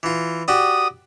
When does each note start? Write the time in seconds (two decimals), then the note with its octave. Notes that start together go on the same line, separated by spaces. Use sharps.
0.03 E3 F4
0.48 F#4 G4 D5 D#6